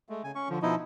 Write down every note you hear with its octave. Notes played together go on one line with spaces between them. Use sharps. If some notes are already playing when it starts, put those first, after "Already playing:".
G#3 A3
C#3 G#5
C#4 C#6
D3 F3
B2 F3 D#4 E4 D#5